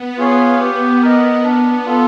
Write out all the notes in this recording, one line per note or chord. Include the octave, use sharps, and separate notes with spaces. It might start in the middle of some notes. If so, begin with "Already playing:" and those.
Already playing: B3
F4 G#4 C#5 F5
G4
A#4 D#5
B3 D4
B3
F4 A4